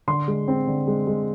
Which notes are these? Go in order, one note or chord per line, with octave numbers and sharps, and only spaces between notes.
D3 C6
G#3
C4
D3
G#3
G#3